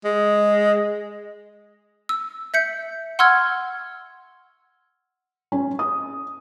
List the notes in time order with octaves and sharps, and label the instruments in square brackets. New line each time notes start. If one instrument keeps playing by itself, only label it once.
[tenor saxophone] G#3
[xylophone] E6
E5 G6 C#7
F#5 C6 C#6 E6 F6 G#6
[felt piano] C#4
D#6